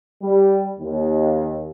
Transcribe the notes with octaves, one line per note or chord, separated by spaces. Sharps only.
G3
D#2